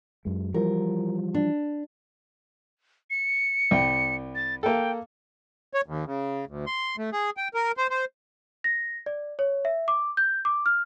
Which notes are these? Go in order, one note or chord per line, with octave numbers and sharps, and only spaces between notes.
F#2 G#3
E3 F3 G3 A#4
D4
C#7
C2 G5
A6
A#3 A4 G5
C#5
D#2
C#3
D2
C6
A3
G#4
G5
A#4
C5
C5
A#6
D5
C#5
E5
D6
G6
D6
F6